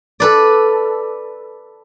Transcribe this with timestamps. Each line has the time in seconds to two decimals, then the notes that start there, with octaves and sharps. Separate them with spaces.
0.20 A4 B4 D5